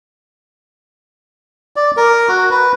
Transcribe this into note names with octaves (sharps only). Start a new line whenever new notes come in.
D5
A#4
F#4
B4